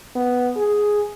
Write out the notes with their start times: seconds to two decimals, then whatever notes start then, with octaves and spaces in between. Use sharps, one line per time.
0.15 B3
0.56 G#4